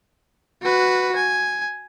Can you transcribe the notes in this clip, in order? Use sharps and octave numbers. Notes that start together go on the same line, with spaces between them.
F#4 B4
G#5